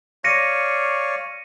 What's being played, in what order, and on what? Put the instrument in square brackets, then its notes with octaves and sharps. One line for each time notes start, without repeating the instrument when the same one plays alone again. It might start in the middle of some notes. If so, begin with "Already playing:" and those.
[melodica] C#5 D5 F5 [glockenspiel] A#6 C#7 D#7